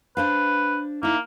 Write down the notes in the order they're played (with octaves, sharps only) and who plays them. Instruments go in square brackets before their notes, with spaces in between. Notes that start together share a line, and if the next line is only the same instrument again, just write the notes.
[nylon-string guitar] D4 C5 F5 [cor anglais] B4
[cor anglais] A#3 [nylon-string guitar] D#4 E4